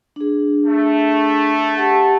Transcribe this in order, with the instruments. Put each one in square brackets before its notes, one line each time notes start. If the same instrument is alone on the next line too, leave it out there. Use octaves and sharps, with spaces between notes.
[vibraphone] D4 G#4
[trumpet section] A3
[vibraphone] G4 F#5 A5